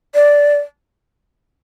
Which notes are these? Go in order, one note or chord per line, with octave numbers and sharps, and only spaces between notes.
D5